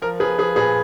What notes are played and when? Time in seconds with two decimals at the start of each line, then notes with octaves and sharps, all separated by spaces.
0.02 F3 A#4
0.20 F3 G#4 B4
0.38 F3 G#4 B4
0.56 A#2 G#4 B4